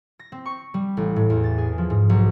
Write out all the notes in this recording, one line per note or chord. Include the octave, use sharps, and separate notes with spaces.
A#6
C4
C#6
G3
A1
A2
E2
A6
G#4
F3
G#2
B1